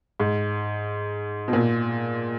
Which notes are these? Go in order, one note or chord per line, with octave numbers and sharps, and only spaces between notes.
G#2
B2
A#2